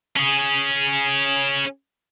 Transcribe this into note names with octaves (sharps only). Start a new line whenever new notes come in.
C#4 G#4